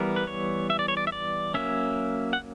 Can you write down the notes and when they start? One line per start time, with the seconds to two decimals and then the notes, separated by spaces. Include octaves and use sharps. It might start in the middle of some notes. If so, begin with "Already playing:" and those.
Already playing: E3 G3 B3 A#4
0.16 B4
0.27 C#5
0.70 E5
0.79 D5
0.88 C#5
0.97 D5
1.07 E5
1.12 D5
1.54 F#3 A#3 C#4 E5
2.33 F#5